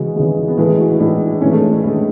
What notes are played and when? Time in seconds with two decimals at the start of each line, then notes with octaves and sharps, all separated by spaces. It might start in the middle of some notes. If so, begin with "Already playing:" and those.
Already playing: C#3 E3 G#3 F#4
0.16 C#3 E3 G#3
0.48 B3
0.58 A2 E3 G#3 A3
0.79 F#4
0.92 E4
1.00 A2 E3 G#3 D4
1.41 A2 E3 G#3 C#4
1.52 A3
1.72 D4
1.84 A2 E3 G#3 E4